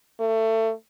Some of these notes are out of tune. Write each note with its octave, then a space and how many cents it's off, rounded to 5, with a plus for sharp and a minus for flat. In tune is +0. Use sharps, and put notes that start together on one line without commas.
A3 +25